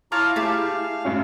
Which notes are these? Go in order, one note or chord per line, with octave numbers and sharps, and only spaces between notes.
E4 F4 C#5 F5 A5 A#5 D6
A3 G4 G#4 F5 A5
F#2 A2 C#4